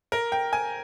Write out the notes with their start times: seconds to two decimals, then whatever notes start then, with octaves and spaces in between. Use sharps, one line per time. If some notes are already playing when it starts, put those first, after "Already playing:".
0.12 A#4
0.32 G5
0.53 G#5